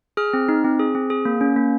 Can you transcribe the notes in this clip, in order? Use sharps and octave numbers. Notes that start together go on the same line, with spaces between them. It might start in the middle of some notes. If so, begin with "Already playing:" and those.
G#4 F6
C4
D#4
C4
G#4
C4
G#4
A#3
C#4
A#3